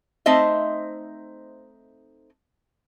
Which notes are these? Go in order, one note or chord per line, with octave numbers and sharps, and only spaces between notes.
A3 C4 D#4 C5 D#5 E5